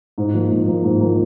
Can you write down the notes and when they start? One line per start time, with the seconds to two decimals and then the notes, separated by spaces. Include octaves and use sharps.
0.18 G#2
0.34 F3 A#3
0.51 G#2
0.67 F3 A#3
0.84 G#2
1.01 F3 A#3